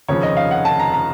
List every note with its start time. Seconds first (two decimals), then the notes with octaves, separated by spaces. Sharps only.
0.08 F1 D#2 C#3 F3 C#5
0.23 D#5
0.37 F5
0.51 F#5
0.65 A5
0.80 A#5
0.94 A#5